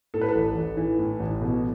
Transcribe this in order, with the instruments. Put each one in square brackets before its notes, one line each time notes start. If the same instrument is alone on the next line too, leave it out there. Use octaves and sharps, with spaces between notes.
[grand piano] A2 A4
B4
A4
A1
A1
E3
A2
A1
B2